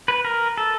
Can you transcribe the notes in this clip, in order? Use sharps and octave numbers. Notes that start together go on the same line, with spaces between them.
B4
A#4
A4